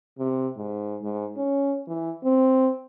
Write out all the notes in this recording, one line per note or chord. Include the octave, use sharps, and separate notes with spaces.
C3
G#2
G#2
C#4
E3
C4